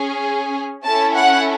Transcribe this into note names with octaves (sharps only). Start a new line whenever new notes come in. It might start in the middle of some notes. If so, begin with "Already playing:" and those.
Already playing: C#4 G#4
C#4 E4 A4 A5
F#5